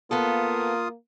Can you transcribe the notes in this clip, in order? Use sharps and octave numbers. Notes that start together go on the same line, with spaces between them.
A#3 B3 F4 A4 D#6